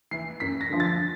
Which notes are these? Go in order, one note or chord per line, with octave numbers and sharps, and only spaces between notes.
E3 C7
F#2 B6
A#6
D3 F3
A6